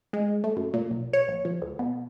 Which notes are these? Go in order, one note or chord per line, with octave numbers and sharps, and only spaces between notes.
G#3
A3
F#2
A#2
B1
C#5
A#1
F3
D2
B2